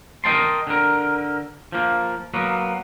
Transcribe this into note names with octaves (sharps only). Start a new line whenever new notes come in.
A#4 D#5 G5 A5 C6
D3 A#4
F3 A#3
F#3 A#3 B3